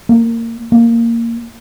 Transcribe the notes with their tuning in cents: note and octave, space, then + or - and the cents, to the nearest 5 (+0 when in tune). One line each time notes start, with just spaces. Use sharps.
A#3 -20
A#3 -10